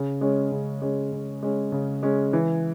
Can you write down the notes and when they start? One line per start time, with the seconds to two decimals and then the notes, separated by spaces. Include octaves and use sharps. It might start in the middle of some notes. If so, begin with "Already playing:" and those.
Already playing: C#3
0.21 G#3 C#4
0.52 C#3
0.82 G#3 C#4
1.12 C#3
1.43 G#3 C#4
1.72 C#3
2.03 G#3 C#4
2.33 E3